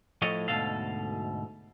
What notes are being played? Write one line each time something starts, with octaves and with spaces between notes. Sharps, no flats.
A2 F3 A4 C#5 D#5
D2 G#2 B2 A4 F5